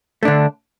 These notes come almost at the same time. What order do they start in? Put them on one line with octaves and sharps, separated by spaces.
A3 D4 D3